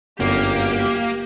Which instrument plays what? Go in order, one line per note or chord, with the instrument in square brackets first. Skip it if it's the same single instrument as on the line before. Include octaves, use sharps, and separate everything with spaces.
[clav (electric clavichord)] G1 F#2 [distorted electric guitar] A#3 [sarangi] G4